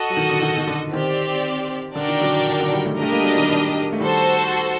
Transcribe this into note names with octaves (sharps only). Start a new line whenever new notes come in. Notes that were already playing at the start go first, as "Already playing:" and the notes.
Already playing: F#4 A4 D#5 F#5
F#3
D#3
D3
D#3
D#3
D3
D#3 C4 G4 D5
D3 D4 F#4 A#4 D5 G5
D#3
D3 F#3
D#3
D#3
D3 F#3
D#3 G3
F#3 A3
A3 D4 G4 A#4 D#5
G3 A#3
F#3 A3
D#3 G3
D#3 G3
A3
D#3 G3 F#4 A4 C5